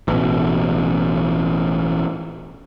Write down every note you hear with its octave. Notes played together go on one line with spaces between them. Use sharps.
A1 B2